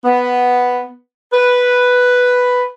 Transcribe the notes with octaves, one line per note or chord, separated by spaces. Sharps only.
B3
B4